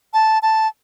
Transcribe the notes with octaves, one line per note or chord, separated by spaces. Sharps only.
A5
A5